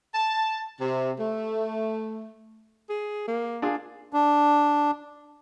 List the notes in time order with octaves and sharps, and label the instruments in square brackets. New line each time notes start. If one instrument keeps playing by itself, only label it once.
[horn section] A5
C3
A3
[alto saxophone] G#4
A#3
[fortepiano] D4 F4 G#4
[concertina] D4